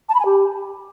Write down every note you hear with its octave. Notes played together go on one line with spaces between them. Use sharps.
A5
B5
G#5
G4